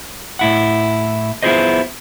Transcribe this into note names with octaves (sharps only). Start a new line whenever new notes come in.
A2 E4 F#5
B3 E4 F4 G#4 C5 D#5